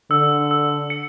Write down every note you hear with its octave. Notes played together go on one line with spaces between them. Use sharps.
D3 E6
E6
C#7